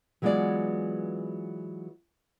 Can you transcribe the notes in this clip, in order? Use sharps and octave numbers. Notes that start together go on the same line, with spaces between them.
E3 F#3 G#3 B3 F4 D5